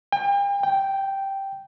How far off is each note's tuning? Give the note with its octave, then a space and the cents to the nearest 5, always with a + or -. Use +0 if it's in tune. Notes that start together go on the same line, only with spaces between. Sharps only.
G5 +40
G5 -5